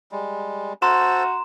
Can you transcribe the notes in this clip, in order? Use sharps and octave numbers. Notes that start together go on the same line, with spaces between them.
G3 G#3
F#4 C5 A5 A#5 C6 E6 E7